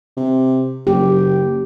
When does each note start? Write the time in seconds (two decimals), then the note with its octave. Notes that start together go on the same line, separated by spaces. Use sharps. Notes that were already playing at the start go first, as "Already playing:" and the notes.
0.17 C3
0.87 F#1 G4